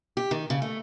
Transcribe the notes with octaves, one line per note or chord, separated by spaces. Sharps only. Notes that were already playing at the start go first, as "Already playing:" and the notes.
G4
D#3
C#3
A3